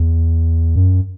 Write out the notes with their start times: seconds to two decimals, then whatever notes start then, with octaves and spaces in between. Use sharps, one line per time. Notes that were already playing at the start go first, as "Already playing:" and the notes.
Already playing: E2
0.76 F#2